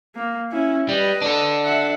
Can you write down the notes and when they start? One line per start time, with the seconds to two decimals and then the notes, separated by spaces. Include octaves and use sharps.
0.15 A#3
0.51 C#4 E4
0.89 G3 B4 D#5
1.22 D4 A4
1.65 E5 F#5